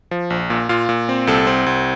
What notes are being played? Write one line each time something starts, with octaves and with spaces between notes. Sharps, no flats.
F3
A#1
A#2
A#2 F4 F5
A#2
C4
C2 A4 A5
C4
C2